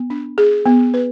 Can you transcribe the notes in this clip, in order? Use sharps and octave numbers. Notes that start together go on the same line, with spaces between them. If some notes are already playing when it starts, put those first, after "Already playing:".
Already playing: B3
D4
G#4
B3
B4